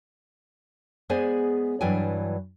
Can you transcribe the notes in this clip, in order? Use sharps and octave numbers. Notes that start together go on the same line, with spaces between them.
G#3 B3 G#4 C5 D5 G#5
G2 E3 F#3 D5 G5 G#5